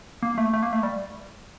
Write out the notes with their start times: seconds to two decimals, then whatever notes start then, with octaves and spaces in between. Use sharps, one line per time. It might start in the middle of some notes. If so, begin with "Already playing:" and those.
0.23 A#3
0.38 A3
0.54 A3
0.63 A#3
0.73 A3
0.83 G3